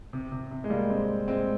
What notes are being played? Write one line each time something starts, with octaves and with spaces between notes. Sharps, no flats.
C3
C3
C3
G#3
G3 A#3
G#3 C4
G#3 C4